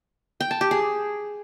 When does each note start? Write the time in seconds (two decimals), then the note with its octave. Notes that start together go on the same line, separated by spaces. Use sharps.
0.41 G5
0.51 A5
0.61 G4
0.71 G#4